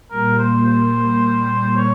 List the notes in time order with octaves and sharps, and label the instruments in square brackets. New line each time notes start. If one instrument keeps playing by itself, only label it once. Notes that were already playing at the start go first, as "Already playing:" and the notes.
[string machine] A#2 G3 A#3 [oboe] A#4
[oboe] C5
C5
C#5